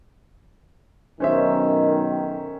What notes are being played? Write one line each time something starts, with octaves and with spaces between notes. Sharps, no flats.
B1 D#3 C#4 C5 E5